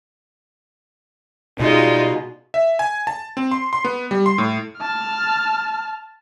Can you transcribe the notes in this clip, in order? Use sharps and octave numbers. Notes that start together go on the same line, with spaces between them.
B2 G3 G#3 C#4 D#4 F4 D5
E5
G#5
A5
C4
C6
C6
B3
G3
C6
A2
A5 F6